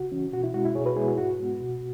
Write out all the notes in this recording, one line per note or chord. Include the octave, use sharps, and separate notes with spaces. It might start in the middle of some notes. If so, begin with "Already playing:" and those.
Already playing: C#3 F#4
E3 C#4
B2 F#4
E4
G#3 C#4 F#4
E4
B2 G#4 C#5
F#4 B4
G#3 B3 E4 G#4
F#4
G#2 F#4
G#3 B3
B2